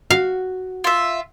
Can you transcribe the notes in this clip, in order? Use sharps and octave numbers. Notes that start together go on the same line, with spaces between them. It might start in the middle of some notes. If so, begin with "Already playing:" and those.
F#4 F5
F4 E5